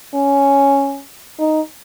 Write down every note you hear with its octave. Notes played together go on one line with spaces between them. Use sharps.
C#4
D#4